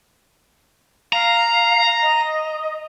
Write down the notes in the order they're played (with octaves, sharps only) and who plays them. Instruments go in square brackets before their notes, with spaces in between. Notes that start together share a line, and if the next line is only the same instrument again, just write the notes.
[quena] F5 [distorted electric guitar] A#5
[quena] D#5